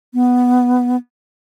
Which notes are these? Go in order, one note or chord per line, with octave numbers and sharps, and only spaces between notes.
B3